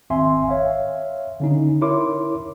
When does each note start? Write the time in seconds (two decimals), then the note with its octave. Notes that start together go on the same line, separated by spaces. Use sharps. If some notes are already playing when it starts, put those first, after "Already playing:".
0.10 G#1 C4 E5 G#5 C6
0.49 C#5 E5 F5
1.40 D3 C#4 D#4
1.81 E4 A#4 C#5 C6 D6